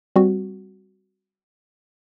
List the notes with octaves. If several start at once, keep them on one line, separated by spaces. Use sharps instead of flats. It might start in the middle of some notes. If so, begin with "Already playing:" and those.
G3 C4 F#4